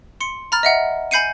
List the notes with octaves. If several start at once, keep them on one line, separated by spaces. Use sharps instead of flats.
C6 C#7
A#5 B5 F6 A6
D#5 E5 F#5
G#5 B5 G6 C7 C#7 D#7